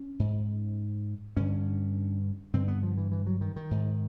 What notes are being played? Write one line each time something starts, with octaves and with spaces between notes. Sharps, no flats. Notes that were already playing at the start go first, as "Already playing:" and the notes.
Already playing: C#4
G#2
G2 D3 C#4
G2 D3 C4
B3
F3
E3
E3
F#3
D#3
D#3
G#2